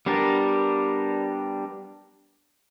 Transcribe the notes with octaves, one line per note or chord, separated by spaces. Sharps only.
G3 B3 D4 G4 A#4